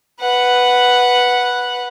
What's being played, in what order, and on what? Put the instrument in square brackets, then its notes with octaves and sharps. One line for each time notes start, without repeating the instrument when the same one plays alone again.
[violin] B4 F#5